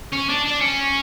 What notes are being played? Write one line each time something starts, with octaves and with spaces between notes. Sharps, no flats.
C#4
D4
D4
C#4